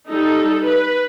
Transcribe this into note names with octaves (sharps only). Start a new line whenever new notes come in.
G3 D#4 A4
B4